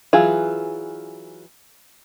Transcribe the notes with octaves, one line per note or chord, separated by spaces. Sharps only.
E3 F#3 F4 G#4